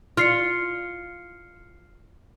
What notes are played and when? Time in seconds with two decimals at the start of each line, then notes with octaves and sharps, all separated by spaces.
0.17 F4 F6 C7 C#7